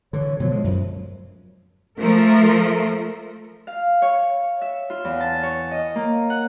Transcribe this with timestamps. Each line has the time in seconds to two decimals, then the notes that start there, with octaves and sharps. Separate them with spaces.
0.13 D3 E3 C#5
0.40 B2 D3 F3 F#3
0.52 G#3
0.64 F#2
1.99 F3 A3 A#4
3.67 F5
4.02 C#5
4.61 E5
4.90 F4
5.05 E2
5.20 A5
5.43 C#5
5.71 D#5
5.95 A#3
6.30 F#5